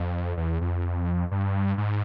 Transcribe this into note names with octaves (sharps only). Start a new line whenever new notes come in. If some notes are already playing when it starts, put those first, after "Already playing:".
Already playing: F2
E2
F2
G2
G#2